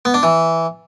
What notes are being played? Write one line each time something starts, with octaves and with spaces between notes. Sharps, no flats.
B3
D4
E3